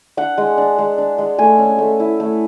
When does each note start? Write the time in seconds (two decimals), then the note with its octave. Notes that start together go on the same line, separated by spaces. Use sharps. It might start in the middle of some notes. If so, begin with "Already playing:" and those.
0.17 D4 F#5
0.38 G#3
0.58 D4
0.78 G#3
0.98 D4
1.18 G#3
1.38 A3 G#5
1.59 C#4
1.79 A3
2.00 E4
2.20 A3